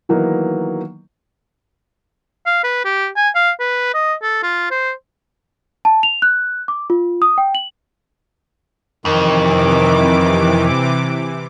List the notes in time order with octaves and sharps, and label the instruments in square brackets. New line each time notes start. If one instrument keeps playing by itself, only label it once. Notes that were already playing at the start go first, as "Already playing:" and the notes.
[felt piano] D#3 E3 F#3 A#3 B3 D#4
[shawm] F5
B4
G4
G#5
F5
B4
D#5
A4
F4
C5
[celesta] A5
F7
F#6
D6
F4
D#6
G5
F#7
[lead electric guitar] F2 [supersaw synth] C3 E3 D6 [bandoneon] D#3